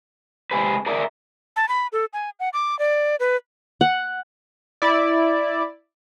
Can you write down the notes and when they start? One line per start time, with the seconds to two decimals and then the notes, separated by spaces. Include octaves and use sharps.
0.51 C3 G#3 G#4 B4
0.86 G#4 A#4 D5 E5
1.56 A5
1.69 B5
1.93 A4
2.13 G#5
2.40 F#5
2.53 D6
2.79 D5
3.20 B4
3.81 F#5
4.82 E4 D5